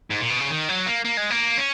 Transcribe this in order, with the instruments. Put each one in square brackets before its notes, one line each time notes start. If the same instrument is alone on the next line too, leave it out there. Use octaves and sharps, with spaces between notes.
[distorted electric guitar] G#2
A#2
B2
C#3
D#3
F#3
A#3
A#3
G#3
A#3
C#4